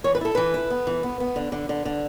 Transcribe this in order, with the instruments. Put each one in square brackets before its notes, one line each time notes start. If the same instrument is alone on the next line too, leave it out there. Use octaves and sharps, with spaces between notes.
[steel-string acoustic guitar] E3 C#5
B4
E4 A4
E3 B4
E4
B3
E3
B3
B3
D3
D3
D3
D3